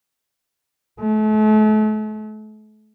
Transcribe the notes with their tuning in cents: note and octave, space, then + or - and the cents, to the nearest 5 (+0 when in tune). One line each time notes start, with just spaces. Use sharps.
A3 -40